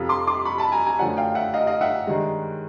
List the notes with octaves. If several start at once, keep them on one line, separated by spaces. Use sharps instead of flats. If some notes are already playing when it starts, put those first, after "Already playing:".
Already playing: F2 C3 F3
C6 D6
C6 D6
B5 C#6
A5 B5
G#5 A#5
G#5 A#5
F#2 D3 F3 A3 F#5 G#5
F5 G5
E5 F#5
D#5 F5
D#5 F5
E5 F#5
G2 D#3 G#3